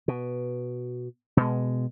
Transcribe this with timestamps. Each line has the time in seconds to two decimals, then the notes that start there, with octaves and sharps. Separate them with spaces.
0.08 B2
1.37 B2 G#3